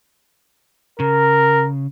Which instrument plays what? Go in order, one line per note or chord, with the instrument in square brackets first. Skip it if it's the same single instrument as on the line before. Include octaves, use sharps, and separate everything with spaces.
[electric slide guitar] C#3 [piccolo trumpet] A#4